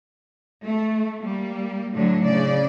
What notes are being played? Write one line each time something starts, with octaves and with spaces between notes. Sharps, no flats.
A3
G3 A#3
A2 D3 F#3 D4
C#3 D5